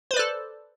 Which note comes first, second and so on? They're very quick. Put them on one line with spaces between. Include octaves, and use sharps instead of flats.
C5 B4 D5 A4